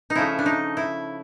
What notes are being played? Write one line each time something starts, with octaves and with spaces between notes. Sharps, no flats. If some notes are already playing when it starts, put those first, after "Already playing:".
D#4
C#3 F3 A3 E4
D4
D#4
E4